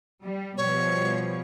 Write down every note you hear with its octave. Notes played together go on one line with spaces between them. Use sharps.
G3
B2 F3 G3 C#5